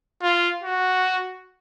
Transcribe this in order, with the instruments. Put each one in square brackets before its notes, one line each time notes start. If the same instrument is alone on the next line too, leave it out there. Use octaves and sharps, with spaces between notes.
[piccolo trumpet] F4
F#4